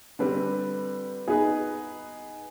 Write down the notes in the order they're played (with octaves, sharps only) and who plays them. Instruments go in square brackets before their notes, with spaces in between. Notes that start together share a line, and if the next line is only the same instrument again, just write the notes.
[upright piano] D3 G3 C4 [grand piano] B4
[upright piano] B3 D#4 B4 [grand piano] G#4